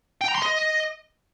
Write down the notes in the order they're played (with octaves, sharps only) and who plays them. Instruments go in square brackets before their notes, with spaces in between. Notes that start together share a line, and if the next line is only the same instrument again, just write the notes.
[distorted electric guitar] G5
A#5
C6
D#5